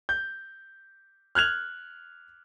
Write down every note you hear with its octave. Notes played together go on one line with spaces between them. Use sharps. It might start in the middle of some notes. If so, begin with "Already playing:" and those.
G6
F6 F#6 G#6 F7